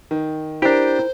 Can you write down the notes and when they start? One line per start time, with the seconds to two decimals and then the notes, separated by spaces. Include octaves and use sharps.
0.11 D#3
0.62 D4 E4 G4 A#4 C5 G5